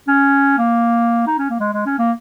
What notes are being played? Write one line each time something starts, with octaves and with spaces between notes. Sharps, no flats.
C#4
A#3
D#4
C#4
A#3
G#3
G#3
C#4
A#3